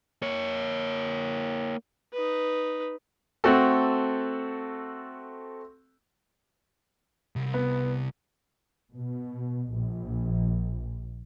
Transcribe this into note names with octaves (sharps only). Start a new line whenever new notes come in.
A#3 C#5
D#4 B4
A3 C4 F#4 A4
C2
B3
B2
A#1